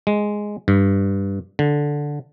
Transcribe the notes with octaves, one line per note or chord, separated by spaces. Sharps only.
G#3
G2
D3